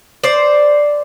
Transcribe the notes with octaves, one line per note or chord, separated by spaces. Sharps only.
C5 D5